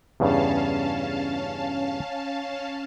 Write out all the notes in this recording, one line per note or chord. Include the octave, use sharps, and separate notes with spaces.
E2 G2 C#3 C#4 F5 A5